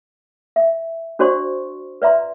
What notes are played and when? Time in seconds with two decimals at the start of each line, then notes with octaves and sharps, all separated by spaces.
0.56 E5
1.19 D4 F#4 C5 D5 C6 C#6
2.02 B4 D5 E5 A#5 C6